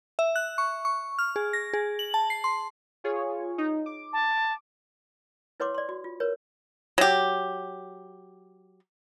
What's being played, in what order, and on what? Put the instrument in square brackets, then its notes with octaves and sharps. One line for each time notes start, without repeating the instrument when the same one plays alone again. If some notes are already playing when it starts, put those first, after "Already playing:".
[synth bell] E5
F#6
C#6
C#6
F6
G#4
A#6
G#4
F#7
A5
C7
C6
[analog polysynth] F4 G#4 C#5
D#4
D6
[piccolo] A5
[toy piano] E4 B4 C#5 F#5 C6 D6
D5 C6
F#4
F4
A#4 B4 C#5
[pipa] F#3 G4